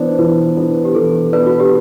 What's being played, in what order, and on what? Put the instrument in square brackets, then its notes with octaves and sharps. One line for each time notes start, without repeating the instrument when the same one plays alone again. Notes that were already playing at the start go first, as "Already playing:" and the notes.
Already playing: [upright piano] E3 B3 D4 [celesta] C5
[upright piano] E3 [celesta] B4
[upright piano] B3 D4
[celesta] G4
[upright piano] E3 [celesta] A4
[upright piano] B3 D4 [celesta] B4
[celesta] F#4
G4